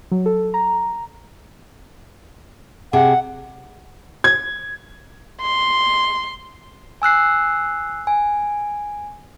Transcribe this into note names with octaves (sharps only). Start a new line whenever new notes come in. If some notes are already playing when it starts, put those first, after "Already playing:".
F#3
A4
A#5
C3 G#4 F#5
G#6
C6
G#5 E6 F#6 C7
G#5